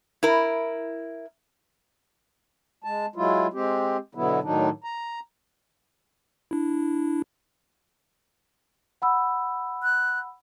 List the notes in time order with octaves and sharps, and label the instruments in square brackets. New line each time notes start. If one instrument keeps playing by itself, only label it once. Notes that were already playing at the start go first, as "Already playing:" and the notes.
[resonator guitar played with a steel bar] E4 A#4
[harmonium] G#3 A5
F#3 G#3 E4 F4
G#3 C4 G4
B2 D3 F#3 B3 E4
A2 D#3 F#3 D4 D#4
A#5
[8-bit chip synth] D4 E4
[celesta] F#5 B5 E6
[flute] F#6